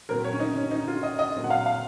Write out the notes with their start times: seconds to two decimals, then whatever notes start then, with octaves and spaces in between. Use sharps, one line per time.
0.09 A#2 F#3 C4 A#4
0.24 C#5
0.33 C#4
0.40 D#4
0.56 C#4
0.71 D#4
0.88 F4
1.03 D#5
1.19 D#5
1.34 A#2 F#3 C4
1.44 F#5
1.50 F5
1.66 F5